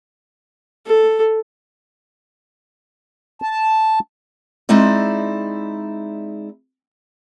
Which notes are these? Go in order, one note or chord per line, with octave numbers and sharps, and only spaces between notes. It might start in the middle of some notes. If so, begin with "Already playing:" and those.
A4
A5
G#3 C4 D#4 E4 D5